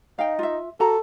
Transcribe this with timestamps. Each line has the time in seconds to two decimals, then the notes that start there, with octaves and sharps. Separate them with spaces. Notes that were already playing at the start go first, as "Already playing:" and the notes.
0.18 D#4 F5 G5
0.39 F4 E5
0.80 F#4 A4 A#5